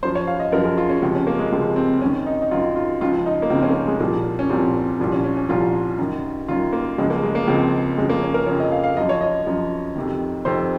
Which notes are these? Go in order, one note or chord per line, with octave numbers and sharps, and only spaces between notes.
F#2 F3 C5
C#5
F5
D#5
F#2 F3 A#4
G#4
F4
C#4
C#2 C3 F3
C#4
A#3
G#3
C#2 C3 F3
C4
F#2 D#3 C#4
D#4
D#4
F#2 D#3 F4
F4
C#2 C#3 F3 F4
D#4
A#3
C#2 C#3 F3 C4
C#4
A#3
C4
G#3
C2 A#2 F3 A#3
C#4
C2 A#2 F3 C4
C2 A#2 F3
C#4
C#4
C#4
C2 A#2 F3 F4
F#2 D#3
F#2 D#3 F4
A#3
C#2 C#3 F3 G#3
A#3
G#3
A#3
C#2 C#3 F3 C4
F2 C#3 F3 G#3
A#3
C#4
A#4
F2 C#3 F3 C#5
D#5
F5
F5
F#2 F3 D#5
C#5
D#5
F#2 F3
F2 C3 D#3
F2 C3 D#3 C5